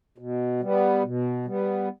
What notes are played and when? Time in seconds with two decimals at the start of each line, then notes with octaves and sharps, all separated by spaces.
0.18 B2
0.61 G3 B3
1.03 B2
1.46 G3 B3